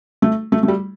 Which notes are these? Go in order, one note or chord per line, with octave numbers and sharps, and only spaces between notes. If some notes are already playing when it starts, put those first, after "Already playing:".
A3
A3
A3
G3